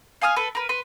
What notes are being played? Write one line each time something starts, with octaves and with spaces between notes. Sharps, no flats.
F5 G#5 D#6 F6
A4 B4
A#4 B4
B4 C6